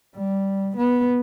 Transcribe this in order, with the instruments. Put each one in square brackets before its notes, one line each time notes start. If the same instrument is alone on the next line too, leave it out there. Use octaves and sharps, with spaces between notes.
[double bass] G3
B3